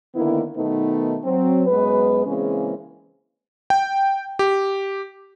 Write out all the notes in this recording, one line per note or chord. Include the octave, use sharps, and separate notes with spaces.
D3 D#3 A#3 B3 E4
B2 D#3 A3 B3 D#4
F#3 C4
F#2 G#3 B3 B4
C#3 E3 G#3 A#3 C4 C#4
G5
G4